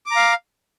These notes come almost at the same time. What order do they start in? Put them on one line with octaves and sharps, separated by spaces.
D6 A#5 F5